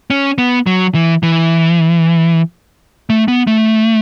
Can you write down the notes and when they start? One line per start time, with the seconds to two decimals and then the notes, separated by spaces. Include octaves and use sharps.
0.10 C#4
0.38 B3
0.67 F#3
0.94 E3
1.23 E3
3.10 A3
3.28 B3
3.47 A3